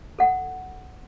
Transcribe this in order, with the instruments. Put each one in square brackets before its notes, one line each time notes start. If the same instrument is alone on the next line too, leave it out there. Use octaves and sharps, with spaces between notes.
[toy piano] A4 F#5